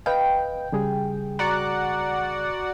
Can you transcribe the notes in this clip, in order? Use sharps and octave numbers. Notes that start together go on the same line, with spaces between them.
B4 D#5 F5 G5
C#3 G3 G#4
F#4 D5 F#5 A#5